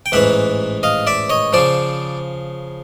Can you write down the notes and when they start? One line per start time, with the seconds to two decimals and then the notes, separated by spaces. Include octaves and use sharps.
0.06 G5
0.12 A1 G#2 E3 E5 F#5
0.83 D#5 F5
1.07 D5 E5
1.30 C#5 D#5
1.53 C#3 F3 C5 D5